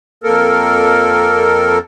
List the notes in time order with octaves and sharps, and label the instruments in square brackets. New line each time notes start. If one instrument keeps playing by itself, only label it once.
[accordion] F2 A#3 A4 A#4